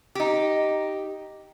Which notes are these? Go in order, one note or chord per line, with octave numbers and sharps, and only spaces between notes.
D#4 G4